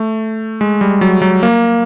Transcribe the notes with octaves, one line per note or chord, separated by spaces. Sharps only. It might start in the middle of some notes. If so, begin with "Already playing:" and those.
Already playing: A3
G#3
G3
F#3
F#3
A#3